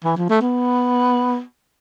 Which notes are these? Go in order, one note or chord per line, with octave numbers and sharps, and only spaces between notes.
E3
F3
A3
B3